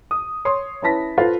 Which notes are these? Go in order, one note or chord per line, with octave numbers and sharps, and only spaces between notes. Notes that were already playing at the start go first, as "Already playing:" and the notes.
D#6
C#5 C6 D#6
C#4 E4 B4 A5 A#6 B6
F4 A4 B4 C5 F5